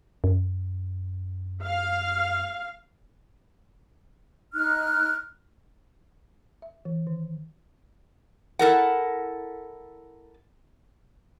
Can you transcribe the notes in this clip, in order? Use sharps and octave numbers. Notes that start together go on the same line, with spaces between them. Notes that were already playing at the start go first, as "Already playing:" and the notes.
F#2
F5
D#4 F6 F#6
E5
E3
D#3
E4 A4 A#4 F#5